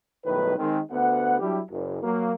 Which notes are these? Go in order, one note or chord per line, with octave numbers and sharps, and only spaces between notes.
B1 A2 D#3 G3 B4
D#3 G#3 C4
D2 B3 F#5
F#3 G3 D4 E4 G4
F#1
F#3 A#3